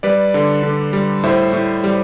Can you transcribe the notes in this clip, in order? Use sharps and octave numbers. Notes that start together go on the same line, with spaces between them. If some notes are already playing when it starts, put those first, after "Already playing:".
G3 B4 D5
D3
D3
G3
A2 C5 E5
A2
G3